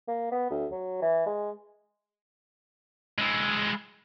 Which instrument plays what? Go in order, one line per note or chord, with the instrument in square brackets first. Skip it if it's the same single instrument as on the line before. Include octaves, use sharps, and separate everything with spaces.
[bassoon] A#3
B3
D2
F#3
E3
G#3
[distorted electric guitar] G#3 E4